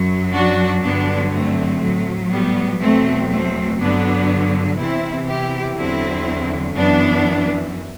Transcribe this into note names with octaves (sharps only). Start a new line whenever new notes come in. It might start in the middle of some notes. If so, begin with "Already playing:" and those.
Already playing: F#2 F#3
D4 F#4
G2 D3 F#3 B3 D4
A3 C4
A2 F#3
G3 B3
E2 B2 F#3 A3 C4
A3 C4
G2 D3 F#3 B3 D4
E2 C3 E3 C4 E4
E4 G4
E2 D3 F#3 C4 E4
F#2 E3 B3 D4